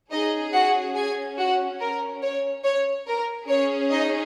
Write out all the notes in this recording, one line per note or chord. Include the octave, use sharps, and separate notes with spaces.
C#4 D#4 G#4 D#5
F#4 F#5
G#4 G#5
F#4 F#5
A#4
C#5
C#5
A#4
C#4 G#4 C#5
D#4 D#5